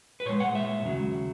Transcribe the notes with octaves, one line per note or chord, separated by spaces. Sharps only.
B4
A#2 G#3 C#5
F#5
E5
D#2 C#3 F#3